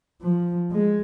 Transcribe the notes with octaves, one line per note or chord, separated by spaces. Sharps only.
F3
G#3